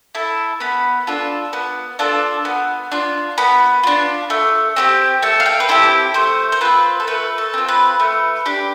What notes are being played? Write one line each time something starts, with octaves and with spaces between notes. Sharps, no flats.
E4 A4
B3 B5
D4 F4 A4
B3
D4 F4 A4
B3
D4 F4
B3 B5
D4 F4
A3
C4 E4 G4
A3 A5
F5
G5
B4
C4 E4 G4 A4
A3 C5
C5
C4 F4 B4
A4
A3 B4
A4
C4 F4
B4
A3
D4 G4